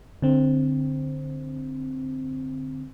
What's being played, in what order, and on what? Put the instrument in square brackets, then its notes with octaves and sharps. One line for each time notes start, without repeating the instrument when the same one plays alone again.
[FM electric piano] D3 C4